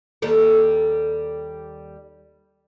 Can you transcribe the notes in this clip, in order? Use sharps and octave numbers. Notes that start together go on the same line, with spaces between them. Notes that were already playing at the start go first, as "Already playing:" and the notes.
D#2 G3 A4